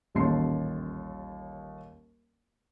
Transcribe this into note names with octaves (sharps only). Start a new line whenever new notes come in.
D#1 A1 D#2 A5 C6 C7